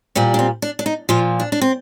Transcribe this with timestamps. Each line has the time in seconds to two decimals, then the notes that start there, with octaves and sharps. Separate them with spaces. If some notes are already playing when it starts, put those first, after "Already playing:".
0.15 A#2 G3 C4
0.34 D4
0.39 C4
0.62 D4
0.79 D4
0.86 D#4
1.09 A#2 F3 F4
1.40 D4
1.52 D4
1.61 C4